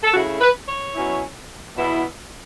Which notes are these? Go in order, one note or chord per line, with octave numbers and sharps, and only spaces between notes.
A4
C#3 A3 E4 F#4
B4
C#5
B2 F#3 C#4 E4
E2 B2 B3 E4